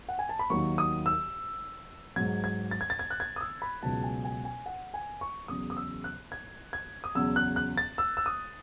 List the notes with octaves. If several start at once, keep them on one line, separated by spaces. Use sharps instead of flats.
F#5
G#5
A5
B5
D#2 D#3 F#3 C#6
D#6
E6
G#2 F#3 G#6
G#6
A6
G#6
A6
G#6
F#6
G#6
D#6
E6
B5
C#2 B2 F#3 A5
G#5
G#5
G#5
F#5
G#5
C#6
E2 C#3 F#3 D#6
D#6
E6
F#6
G#6
G#6
D#6
E2 C#3 F#3 E6
F#6
F#6
A6
E6
E6
D#6